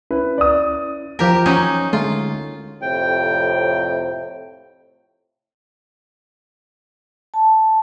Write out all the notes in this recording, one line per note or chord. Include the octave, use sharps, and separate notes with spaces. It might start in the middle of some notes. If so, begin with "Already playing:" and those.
C#4 E4 B4
D5 D#6
D#2 E3 F3 G4 A#4
F#3 C#4 D#4
D3 G#3 A3 F4
F2 A2 C3 G5
A5